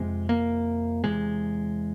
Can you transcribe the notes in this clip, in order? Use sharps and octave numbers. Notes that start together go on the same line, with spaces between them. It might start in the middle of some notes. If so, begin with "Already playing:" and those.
Already playing: F2 C3 G#3
A#3
E2 C3 G#3